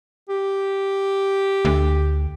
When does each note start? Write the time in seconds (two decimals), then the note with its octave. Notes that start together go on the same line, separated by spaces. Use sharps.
0.29 G4
1.65 D2